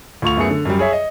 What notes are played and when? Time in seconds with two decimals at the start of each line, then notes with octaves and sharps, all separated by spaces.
0.22 D2 F4 C#6 F7
0.37 F#2 A3 B3 G#4 C#7
0.50 D3
0.65 F#2 F#3 G3
0.79 G#4 C#5 E5
0.93 D#5